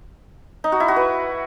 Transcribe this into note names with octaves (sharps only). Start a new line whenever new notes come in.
D#4
F#4
E4
F#4
B4